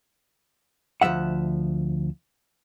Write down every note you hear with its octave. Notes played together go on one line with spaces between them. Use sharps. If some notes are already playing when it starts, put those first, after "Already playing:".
D2 F3 F#3 E5 F#5